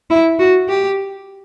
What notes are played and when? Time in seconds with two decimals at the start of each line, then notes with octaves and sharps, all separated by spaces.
0.10 E4
0.40 F#4
0.69 G4